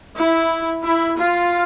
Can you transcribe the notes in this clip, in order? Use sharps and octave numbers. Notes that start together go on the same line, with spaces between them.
E4
E4
F4